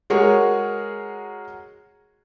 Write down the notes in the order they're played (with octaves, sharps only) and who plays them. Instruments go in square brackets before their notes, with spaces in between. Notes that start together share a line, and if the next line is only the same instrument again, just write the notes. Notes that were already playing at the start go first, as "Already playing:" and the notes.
[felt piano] G#3 F#4 G#4 A#4 C#5